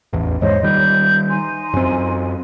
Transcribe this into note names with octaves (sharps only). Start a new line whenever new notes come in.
A1 E2
E2 G#2 G#3 C5 C#5 D#5
D#3 G3 G6
D#4 G#5 C6
F#2 C4